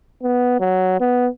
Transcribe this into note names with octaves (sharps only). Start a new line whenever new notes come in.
B3
F#3
B3